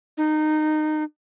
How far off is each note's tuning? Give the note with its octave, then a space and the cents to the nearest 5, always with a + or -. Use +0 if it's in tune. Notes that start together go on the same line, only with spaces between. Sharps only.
D#4 -20